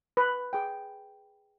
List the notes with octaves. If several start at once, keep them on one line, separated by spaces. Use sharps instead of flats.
B4
G#4 G5